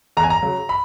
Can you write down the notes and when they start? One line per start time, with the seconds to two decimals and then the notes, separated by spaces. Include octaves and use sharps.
0.17 E2 A#5
0.24 G#5
0.30 A#5
0.42 C#3 F#3
0.69 B5